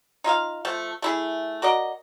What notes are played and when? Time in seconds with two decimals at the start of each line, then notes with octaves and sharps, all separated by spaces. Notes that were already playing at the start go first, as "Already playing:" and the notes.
0.24 D#4 F4 E5 F5
0.65 F3 A3
1.02 A3 E4 G#4
1.62 F#4 A#4 D5 D#5